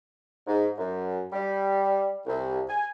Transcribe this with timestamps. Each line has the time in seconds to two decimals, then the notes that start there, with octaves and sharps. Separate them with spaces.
0.47 G#2
0.78 F#2
1.33 G3
2.26 C2
2.69 G#5